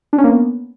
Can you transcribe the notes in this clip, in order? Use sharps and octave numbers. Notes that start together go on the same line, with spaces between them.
D4
C#4
A#3
B3